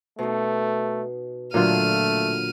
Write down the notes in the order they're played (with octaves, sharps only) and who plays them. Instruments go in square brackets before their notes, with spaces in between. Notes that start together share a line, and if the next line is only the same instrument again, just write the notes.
[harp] B2 D#4 [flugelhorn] A3
[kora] A#2 D3 F4 [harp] F#3 [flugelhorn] A3 [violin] F6 D#7